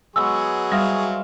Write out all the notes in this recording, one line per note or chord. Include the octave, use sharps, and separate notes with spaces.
F#3 G#3 B3 G#4 C#6 E6
G3 C5 E5 F5 D#6